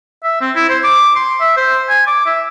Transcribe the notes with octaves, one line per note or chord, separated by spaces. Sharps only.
E5
C4
E4
C5
D6
C6
E5
C5
G#5
D6
E5